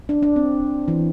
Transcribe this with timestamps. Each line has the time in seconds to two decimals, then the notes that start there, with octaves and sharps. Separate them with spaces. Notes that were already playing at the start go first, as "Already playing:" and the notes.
0.09 D4
0.22 D4
0.36 C4
0.88 E3